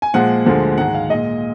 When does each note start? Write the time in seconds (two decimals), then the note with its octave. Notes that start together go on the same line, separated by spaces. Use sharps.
0.02 G#5
0.14 A#2 F3 G#3 F#5
0.46 D2 D3 F3 G#3
0.78 G#2 D#3 G#3 F#5
0.95 F5
1.09 A#2 G#3 D#5